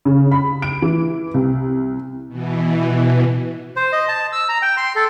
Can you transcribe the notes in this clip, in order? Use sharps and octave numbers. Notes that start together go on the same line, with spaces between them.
C#3
B5
D7
E3
C2
B2 E3
C5
D#5
A5
E6
A#5
G5
C6
A4